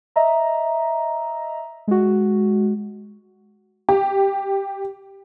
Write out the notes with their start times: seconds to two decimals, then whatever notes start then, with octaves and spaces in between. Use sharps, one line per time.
0.16 D#5 E5 A#5
1.88 G#3 F#4
3.89 G4